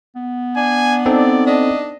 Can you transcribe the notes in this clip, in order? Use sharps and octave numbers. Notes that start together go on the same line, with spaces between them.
B3
D4 G#5
C4 D#4 A4 D5
D4 D#5